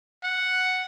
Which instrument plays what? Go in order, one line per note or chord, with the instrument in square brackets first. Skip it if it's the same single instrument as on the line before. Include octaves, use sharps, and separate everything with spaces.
[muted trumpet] F#5